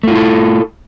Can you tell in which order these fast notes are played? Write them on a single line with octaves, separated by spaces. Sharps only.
A3 F4 E4 A4